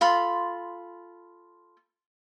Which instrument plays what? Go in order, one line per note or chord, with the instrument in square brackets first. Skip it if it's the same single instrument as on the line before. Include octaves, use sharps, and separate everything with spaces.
[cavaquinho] F4 A4 B5 C6